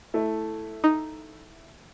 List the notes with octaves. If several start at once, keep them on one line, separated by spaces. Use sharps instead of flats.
A3 E4
D#4